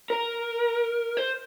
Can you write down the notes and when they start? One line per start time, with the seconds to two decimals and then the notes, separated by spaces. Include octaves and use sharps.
0.10 A#4
1.17 C5